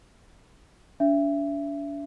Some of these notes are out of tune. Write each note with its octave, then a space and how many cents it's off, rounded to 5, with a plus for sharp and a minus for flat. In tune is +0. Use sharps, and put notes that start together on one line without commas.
D4 -40 E5 +25